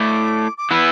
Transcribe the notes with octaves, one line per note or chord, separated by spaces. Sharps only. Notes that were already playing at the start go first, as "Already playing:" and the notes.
Already playing: A3 E4 A4 D5 D6
D6
E3 B3 E4 E6 F#6